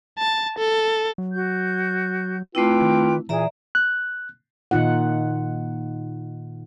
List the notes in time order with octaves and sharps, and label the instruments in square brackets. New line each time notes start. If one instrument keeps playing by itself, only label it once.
[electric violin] A5
A4
[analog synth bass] F#3
[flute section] F#4 G6
[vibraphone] A3 C4 E4 [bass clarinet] F4 [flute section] B4 G5 D6
[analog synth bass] D#3
[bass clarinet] A#2 [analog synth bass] E3 [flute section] G#4 [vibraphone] D5 E5 A#5
[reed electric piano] F#6
[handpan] A#2 D#3 D#4 F4 F#5